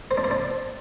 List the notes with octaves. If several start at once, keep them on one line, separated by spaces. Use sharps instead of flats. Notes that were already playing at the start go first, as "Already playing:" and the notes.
C5
D4
C5
D4